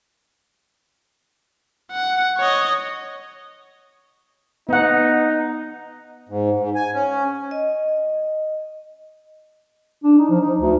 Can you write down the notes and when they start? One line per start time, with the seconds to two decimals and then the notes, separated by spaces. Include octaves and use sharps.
1.92 F#5
2.37 C#5 D#5
4.69 B3 D#4 F#5
6.29 G#2
6.59 G#2
6.75 G#5
6.94 C#4
7.51 D#5
10.04 D4
10.18 D#4
10.30 F3
10.41 D#4
10.60 D2